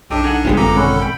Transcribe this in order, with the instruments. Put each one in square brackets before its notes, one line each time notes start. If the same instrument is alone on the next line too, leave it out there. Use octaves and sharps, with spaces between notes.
[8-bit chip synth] B1 D4 [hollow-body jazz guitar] F#2 D#4 [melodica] G4 A4 G5
[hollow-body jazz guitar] D#4 A4 F#5 [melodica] G#5
[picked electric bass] G1 G3 [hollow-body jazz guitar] G#3 B3 F4
[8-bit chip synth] G#1 F#2 A4 [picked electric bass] D3 C4 [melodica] A#5 D6
[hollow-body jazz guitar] B2 G#3 [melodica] C#4 E4 F#5
[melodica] G5 B5